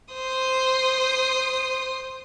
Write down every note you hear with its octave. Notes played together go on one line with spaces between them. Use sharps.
C5 D#6